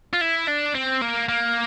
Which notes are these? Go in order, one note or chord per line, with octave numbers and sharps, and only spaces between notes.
F4
E4
D4
C4
A#3
A#3